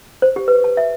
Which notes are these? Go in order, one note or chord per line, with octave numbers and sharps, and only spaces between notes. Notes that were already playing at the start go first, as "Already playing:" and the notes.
C5
G4
B4
A5
E5